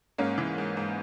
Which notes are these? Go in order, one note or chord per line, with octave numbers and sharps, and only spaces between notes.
G#2 A#3 C#4
E3
G#2
G#2